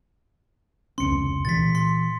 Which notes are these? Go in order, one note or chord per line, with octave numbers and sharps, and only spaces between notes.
F1 C#2 C#4 C6 C#7
A#2 E3 A6 B6
C6